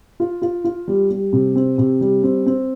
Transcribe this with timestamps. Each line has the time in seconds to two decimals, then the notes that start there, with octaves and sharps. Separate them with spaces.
0.20 F4
0.42 F4
0.65 F4
0.88 G3
1.11 G3
1.33 C3
1.56 C4
1.78 C3
2.01 G3
2.23 C4
2.46 C4